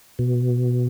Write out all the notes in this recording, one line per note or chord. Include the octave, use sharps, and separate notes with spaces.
B2